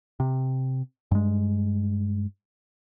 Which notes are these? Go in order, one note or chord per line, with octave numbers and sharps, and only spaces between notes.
C3
G2 G#3